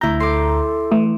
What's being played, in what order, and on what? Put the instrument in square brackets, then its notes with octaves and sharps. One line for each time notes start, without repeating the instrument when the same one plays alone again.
[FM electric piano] D2 A#5 [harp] E4 G6
[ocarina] A4 [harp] C6 D6
[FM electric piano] E3 [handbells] A3